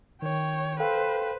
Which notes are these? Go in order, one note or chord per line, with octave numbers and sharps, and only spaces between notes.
D#3 C#5 G5
A4 B4 C5 F5 G5